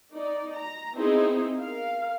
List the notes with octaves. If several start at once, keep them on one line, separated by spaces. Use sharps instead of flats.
D#4 D5
A#5
B3 C4 D#4 E4 G#4 C5
A#4 F5